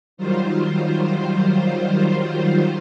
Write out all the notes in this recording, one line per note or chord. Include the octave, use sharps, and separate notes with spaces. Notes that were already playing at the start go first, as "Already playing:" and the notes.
D#3 F#3 G3 F4 C5